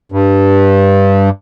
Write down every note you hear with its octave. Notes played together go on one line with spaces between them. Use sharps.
G2